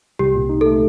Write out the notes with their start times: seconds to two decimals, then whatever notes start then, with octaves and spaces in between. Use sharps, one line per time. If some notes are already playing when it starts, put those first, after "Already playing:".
0.19 C2 G4
0.35 A#2
0.49 D#4
0.61 A4
0.66 A3